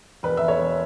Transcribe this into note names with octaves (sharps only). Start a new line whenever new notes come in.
E1 B4
E1 E5
C#5
E1